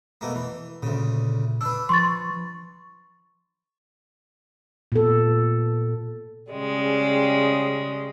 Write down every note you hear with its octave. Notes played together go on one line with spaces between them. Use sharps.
B2 A3 A#3
E3
D2 A#2 C#3
D4 B4 E6
F3 C6 C#6 A6
A#2 B3 A4
C#3 G3 G#3